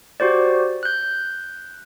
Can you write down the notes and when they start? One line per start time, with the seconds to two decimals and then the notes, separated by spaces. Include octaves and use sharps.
0.20 F#4 G4 C5 D5
0.83 F#6 G6